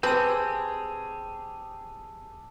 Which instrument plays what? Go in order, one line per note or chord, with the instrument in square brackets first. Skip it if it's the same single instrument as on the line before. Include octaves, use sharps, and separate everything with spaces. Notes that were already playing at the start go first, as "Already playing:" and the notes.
[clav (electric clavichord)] C4 [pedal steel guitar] G4 G#4 [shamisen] B4 [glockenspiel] A5 E6